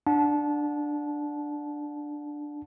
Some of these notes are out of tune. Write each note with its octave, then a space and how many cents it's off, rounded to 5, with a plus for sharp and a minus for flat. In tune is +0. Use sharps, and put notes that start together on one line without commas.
D4 +10 F#5 -25 A5 -20